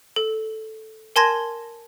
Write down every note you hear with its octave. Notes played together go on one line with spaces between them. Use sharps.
A4
A#4 G#5 A5 C6 G#6 A#6